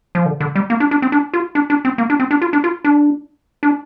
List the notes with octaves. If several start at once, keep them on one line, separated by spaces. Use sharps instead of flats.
F3
D3
D3
G3
A#3
D4
D4
C4
D4
F4
D4
D4
C4
A#3
D4
C4
D4
F4
D4
F4
D4
D4